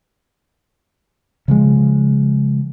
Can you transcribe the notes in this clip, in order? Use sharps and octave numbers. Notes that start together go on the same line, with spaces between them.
C#3 F3 G#3